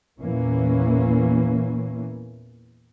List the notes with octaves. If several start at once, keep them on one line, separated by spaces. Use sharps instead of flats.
E2 A#2 E3 A#3 C#4